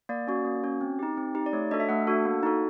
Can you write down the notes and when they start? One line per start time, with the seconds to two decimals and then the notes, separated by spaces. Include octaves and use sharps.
0.09 A#3 D5
0.27 C#4 F#4
0.45 A#3
0.64 C#4 F#4
0.81 C4
0.99 D#4 G4
1.17 C4
1.35 D#4 G4
1.46 D5
1.53 A3 C#5
1.71 D4 F#4 A4 D#5
1.80 E5
1.89 A3 F#5
2.07 D4 F#4 A4
2.25 A#3
2.43 D#4 F#4 A4